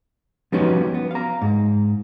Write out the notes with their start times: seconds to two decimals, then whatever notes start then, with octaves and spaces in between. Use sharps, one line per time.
0.52 F3 G3 B3 C#4 D#4 F#4
0.94 B3
1.11 F5 A#5
1.41 G#2